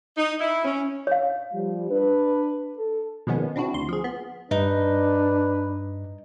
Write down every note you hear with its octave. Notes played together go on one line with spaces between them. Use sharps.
D#4
E4
C#4
C#5 F5
F3 G3
D4 B4
A4
B2 D#3 F3 G#3 B3 C#4
C4 D4 E4 F#4
D2 C6
F3 G#4
B3
G2 D4 D#4 B4